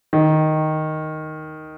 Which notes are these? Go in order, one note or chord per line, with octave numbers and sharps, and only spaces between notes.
D#3